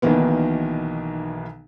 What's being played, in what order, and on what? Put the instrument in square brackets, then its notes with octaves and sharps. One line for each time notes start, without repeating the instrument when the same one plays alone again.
[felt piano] B1 B2 D#3 E3 A#3 B3